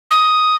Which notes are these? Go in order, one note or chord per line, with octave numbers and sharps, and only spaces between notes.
D#6